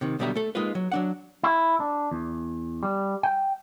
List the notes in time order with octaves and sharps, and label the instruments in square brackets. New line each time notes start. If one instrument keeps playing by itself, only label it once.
[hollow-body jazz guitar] C3 D#3
B1 B2 D3 G3 E5 A#5
A3 A4
G#3 A#3 D#4 F4 B4
F#3
F#3 D4 F#5
[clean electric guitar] E4
D4
E2
G3
G5